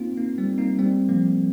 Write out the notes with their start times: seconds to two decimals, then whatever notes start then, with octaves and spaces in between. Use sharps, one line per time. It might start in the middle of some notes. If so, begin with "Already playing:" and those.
Already playing: A#3 C4 D#4 F4
0.17 A#3 D#4
0.38 G3 C4
0.58 A#3 D#4
0.79 G3 C4
1.09 F3 A#3